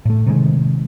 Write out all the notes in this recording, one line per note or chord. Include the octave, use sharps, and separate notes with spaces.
A2 A3
C3 D#3 F#3 G#3